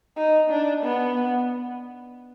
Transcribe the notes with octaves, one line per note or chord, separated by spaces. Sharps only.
D#4
D4
B3